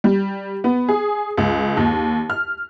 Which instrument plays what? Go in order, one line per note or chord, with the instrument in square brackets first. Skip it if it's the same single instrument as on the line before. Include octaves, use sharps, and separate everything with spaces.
[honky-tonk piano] G3
B3
G#4
C#2
D#2
F6